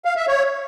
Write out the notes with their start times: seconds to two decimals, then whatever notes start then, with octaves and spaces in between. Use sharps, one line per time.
0.05 F5
0.16 E5
0.28 C#5